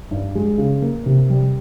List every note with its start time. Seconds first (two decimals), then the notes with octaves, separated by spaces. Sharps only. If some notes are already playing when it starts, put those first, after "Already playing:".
0.11 G2
0.35 G#3
0.58 C#3
0.82 A#3
1.06 C3
1.30 G3